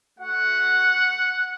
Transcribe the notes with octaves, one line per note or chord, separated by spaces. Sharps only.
A3 F#4 F#5